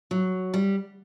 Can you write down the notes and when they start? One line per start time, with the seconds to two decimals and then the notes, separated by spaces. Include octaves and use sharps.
0.11 F#3
0.54 G3